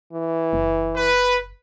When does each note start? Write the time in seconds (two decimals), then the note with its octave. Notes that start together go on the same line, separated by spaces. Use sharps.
0.13 E3
0.53 F#1
0.95 B4